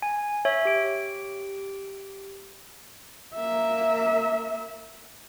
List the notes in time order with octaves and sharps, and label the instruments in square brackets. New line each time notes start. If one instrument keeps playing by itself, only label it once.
[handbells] G#5
C#5 E5
G4 D7
[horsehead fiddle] A#3 E5